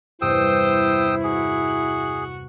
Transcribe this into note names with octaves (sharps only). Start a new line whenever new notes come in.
E2 G2 C3 E4 C5 G5 D#6 E6
F#4 G#4